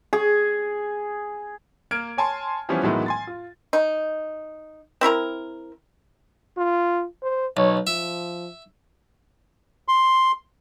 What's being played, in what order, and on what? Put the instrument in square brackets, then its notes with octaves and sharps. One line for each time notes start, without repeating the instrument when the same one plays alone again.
[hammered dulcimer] G#4
[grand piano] A#3 A#4 F6 G#6 D7
C#5 G#5 A5 C6
E3 F3 G3 B3 C#4
A2 D#3 E3 F#3 G#3 B3
G#5 C6 A6
F4
[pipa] D#4
C4 E4 A#4 A#5
[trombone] F4
C5
[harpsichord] B1 [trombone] C#5
[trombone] F3 [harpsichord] E5
[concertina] C6